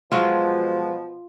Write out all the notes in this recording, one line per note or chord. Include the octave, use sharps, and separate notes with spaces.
B2 F3 F#3 G#3 F4 B4